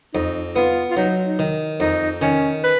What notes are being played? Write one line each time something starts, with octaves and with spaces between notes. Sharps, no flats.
F2 D#4
B3 F4
F4
F#3 D#4
D#4
D#3
F2 D#4
D#3 C#4
B4